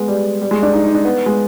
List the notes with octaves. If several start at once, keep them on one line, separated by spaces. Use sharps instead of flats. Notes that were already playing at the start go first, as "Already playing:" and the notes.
Already playing: G#3 B3
G3
G3
G#3
D4
D#4
D#4
D4
B3
G#3